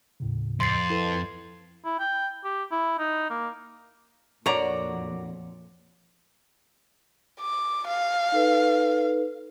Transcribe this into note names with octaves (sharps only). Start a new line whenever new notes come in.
D#2 A2 C#3
F2 C6 A6 C7
E4 A4 B4
E4
G5
G4
E4
D#4
A#3
F2 A#2 D3 F#4 A#4 C#5 D5 A#5
D6
F5
D#4 A4 B4